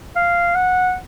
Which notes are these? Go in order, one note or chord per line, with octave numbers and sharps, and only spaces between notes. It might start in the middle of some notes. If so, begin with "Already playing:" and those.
F5
F#5